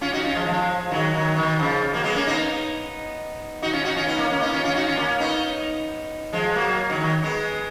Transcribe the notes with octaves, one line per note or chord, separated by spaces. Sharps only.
C#4 F4
D#4 F#4
C#4 F4
F3 G#3
F3 G#3
D#3 F#3
D#3 F#3
B2 D#3
C#3 F3
F#3 A#3
G#3 B3
A#3 C#4
B3 D#4
D#4 F#4
C#4 F4
D#4 F#4
C#4 F4
B3 D#4
A#3 C#4
A#3 C#4
B3 D#4
C#4 F4
C#4 F4
D#4 F#4
C#4 F4
A#3 C#4
B3 D#4
F3 G#3
F#3 A#3
D#3 F#3
D#3 F#3
G#3 B3